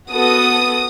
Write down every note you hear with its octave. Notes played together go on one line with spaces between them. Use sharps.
B3 F#4 A4 D#6